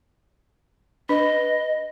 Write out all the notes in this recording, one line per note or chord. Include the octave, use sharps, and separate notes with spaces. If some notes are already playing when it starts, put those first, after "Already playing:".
D4 B4 D#5